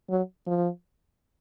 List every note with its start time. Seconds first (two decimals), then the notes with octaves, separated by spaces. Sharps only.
0.10 F#3
0.47 F3